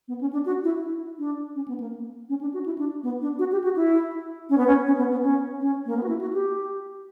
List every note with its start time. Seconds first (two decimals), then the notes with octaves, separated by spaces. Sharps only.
0.08 B3
0.21 C#4
0.33 D4
0.46 F#4
0.64 E4
0.83 E4
1.19 D4
1.55 C#4
1.68 B3
1.80 A#3
2.29 C#4
2.41 D4
2.54 F#4
2.66 E4
2.78 D4
3.03 B3
3.21 D4
3.39 F#4
3.52 G4
3.64 F#4
3.76 E4
4.50 C#4
4.58 B3
4.67 C#4
4.87 C#4
4.98 B3
5.11 B3
5.23 C#4
5.60 C#4
5.86 A#3
5.97 B3
6.03 F#4
6.09 E4
6.21 F#4
6.33 G4